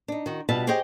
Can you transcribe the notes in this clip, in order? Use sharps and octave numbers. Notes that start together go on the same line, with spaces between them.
D4 D#4
D#3 F#4
B2 G3 F4 B4 E5 A5
G4 G#4 C5 C#5 D#5 G5